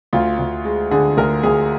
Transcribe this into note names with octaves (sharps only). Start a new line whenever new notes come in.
D2 F4
D2
G#3
D3 G#4
D2 A#4
D2 G#4